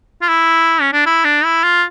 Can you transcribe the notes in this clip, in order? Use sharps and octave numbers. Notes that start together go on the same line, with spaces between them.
F4
E4
C#4
D4
E4
D4
E4
F4